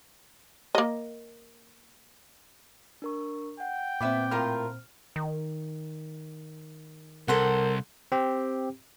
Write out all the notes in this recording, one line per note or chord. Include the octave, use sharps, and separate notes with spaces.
A#3 D#5
D4 A#4 C#6
F#5 G5
A#2 B3 C4 B4 E5 D6
A2 F4 A#4 F6
D#3
C2 A4 A#4 C5 F#5
C4 G4